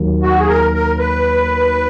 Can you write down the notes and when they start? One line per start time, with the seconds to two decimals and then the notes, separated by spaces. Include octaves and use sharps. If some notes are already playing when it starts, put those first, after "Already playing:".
Already playing: D#2 D#3 F#3 A#3
0.22 F#4
0.40 G#4
0.48 A#4
0.74 A#4
0.99 B4